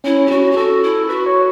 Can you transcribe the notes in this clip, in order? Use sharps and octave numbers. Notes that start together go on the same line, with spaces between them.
C#4 E4
G4
C#4 F#4
G4
F#4 A4
E4
F#4 B4
C#5